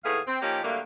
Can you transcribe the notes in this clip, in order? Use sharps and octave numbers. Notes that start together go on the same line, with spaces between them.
D#2 A2 A3 B3 G#4 F5
C4
F3 A#3 C#4 D#4 G4
D3 F#3 G3 A3 A#3